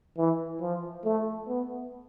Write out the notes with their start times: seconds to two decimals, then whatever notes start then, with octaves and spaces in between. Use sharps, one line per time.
0.17 E3
0.61 F3
1.05 A3
1.48 B3